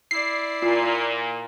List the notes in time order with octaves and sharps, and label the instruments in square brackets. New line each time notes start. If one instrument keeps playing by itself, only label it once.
[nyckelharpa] E4 D5 [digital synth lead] C7
[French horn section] A#2 [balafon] F4